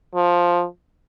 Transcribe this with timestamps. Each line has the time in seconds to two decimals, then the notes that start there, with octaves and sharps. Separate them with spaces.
0.15 F3